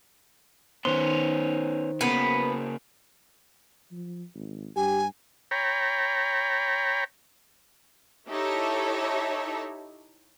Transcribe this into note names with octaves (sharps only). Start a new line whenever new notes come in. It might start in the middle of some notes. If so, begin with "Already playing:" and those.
D#3 B3 C#4 C5 C6
C#3 A#3 B3
F3
G#1
G2 G4 G#5
C#5 G5 A#5 B5
D#4 E4 G4 A4 C#5 E5